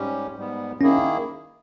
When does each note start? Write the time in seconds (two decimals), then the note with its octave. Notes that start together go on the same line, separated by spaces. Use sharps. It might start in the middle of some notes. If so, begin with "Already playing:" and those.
Already playing: G#2 G3 C#4 G4
0.36 G#2 G3 B3
0.81 D#3 A#3 C#4 E4 G#4